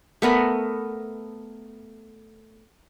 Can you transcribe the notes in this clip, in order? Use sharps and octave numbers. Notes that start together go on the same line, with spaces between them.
A3 B3 A#4 B5